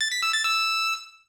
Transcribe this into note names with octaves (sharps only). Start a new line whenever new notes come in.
A6
B6
E6
A6
E6